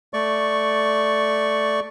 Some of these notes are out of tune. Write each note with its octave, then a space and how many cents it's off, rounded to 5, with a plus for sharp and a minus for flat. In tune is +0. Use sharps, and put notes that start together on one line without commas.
A3 +0 D5 +0 C#6 +0